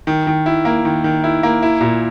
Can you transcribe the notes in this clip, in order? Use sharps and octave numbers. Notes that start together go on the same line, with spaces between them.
D#3
D#3
E4
A#3
D#3
D#3
E4
A#3
E4
A#2